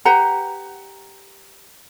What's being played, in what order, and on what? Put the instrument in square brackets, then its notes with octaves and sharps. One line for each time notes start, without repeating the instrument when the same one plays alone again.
[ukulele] G4 B4 F#5 A#5